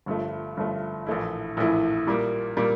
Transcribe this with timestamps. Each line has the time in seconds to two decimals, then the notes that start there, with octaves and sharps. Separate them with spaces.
0.06 G1 G2 F3 A3
0.57 G1 G2 F3 A3
1.07 A#1 A2 E3 A3 E4
1.57 A#1 A2 E3 A3 E4
2.07 A#2 G3 A#3
2.57 A#2 G3 A#3